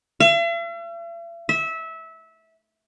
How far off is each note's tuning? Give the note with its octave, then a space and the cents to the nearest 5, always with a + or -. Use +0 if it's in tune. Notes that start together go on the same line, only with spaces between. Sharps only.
E5 +45
E5 -20